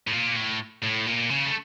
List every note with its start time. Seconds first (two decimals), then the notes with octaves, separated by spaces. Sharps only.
0.07 A2
0.12 A#2
0.36 A2
0.83 A2
1.07 A#2
1.30 C#3
1.45 A3